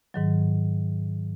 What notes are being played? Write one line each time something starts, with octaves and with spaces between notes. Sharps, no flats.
G#2 D#3 F#3